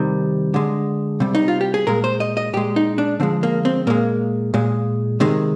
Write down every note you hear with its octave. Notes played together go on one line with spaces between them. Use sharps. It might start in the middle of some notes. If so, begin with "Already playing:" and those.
Already playing: C3 D#3 G3
D3 G#3
C3 G3
D#4
F4
G4
G#4
A#2 G#3 A#4
C5
D#5
D#5
A#2 G#3 G4
D#4
D4
D3 F3 G#3 C4
A#3
C4
A#2 G#3 A#3
A#2 G#3
C3 D#3 G#3